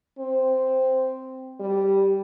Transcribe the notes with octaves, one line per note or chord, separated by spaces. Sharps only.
C4
G3